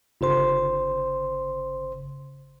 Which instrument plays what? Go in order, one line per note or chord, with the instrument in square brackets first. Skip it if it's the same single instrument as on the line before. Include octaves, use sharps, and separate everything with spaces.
[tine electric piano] G1 C#3 C5 C6